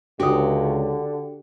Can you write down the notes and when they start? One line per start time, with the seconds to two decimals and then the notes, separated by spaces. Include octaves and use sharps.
0.20 C#2 D3 D4 F#4 G4 D#6